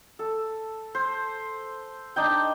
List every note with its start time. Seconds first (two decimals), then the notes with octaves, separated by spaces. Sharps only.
0.19 A4
0.95 C5
2.16 D4 D#4 G5